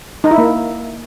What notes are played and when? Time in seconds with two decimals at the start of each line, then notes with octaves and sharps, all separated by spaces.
0.24 D#4
0.31 E4
0.38 A#3